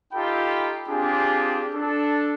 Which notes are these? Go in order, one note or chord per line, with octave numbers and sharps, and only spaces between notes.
D#4 F4 G4 A4 G5 B5
C4 D4 F4 G4 G#4
D4 A4